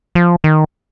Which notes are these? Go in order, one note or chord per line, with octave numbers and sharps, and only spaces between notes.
F3
D#3